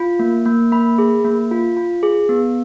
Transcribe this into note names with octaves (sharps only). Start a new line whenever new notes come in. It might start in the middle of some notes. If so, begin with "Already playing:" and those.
Already playing: F4
A#3
A#3
A#3 B5
G#4
A#3
F4
F4
G#4
B3